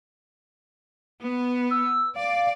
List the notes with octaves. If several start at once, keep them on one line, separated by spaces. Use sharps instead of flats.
B3
E6
D5 F5